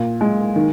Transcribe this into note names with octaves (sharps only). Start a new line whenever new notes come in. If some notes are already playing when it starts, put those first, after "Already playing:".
Already playing: A#2
G#3
D#3